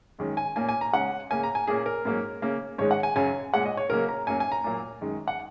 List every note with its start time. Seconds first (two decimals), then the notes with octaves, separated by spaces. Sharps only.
0.19 F#2 D#3 G#3 C#4
0.37 G#5
0.56 A#2 A#3 C#4 G#5
0.69 G#5
0.81 A#5
0.93 C#3 G#3 C#4 F#5
1.30 C#3 A#3 C#4 G#5
1.43 A#5
1.55 G#5
1.67 A#2 A#3 C#4 G#4
1.86 A#4
2.05 G#2 F#3 A#3 C#4
2.42 C#3 A#3 C#4
2.78 G#2 D#3 G#3 C#4 C#5
2.91 F#5
3.03 G#5
3.15 F#2 C#3 F#3 C#4 G#5
3.53 A#2 G#3 C#4 F#5
3.66 D#5
3.77 C#5
3.90 C#3 F#3 A#3 C#4 A#4
4.09 A#5
4.27 F#2 F#3 A#3 G#5
4.40 G#5
4.52 A#5
4.64 A#2 F#3 A#3
5.01 F#2 D#3 G#3
5.28 F#5